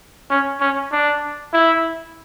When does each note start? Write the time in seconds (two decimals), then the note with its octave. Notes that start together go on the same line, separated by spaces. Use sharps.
0.30 C#4
0.61 C#4
0.92 D4
1.53 E4